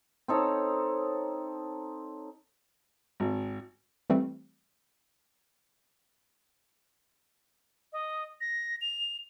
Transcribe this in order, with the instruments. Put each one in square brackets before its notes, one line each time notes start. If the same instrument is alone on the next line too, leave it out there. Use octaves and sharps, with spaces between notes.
[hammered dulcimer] C4 D#4 A4 C#5
[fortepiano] G#1
[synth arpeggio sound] E3 G3 A3 C4
[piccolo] D#5
A#6
F7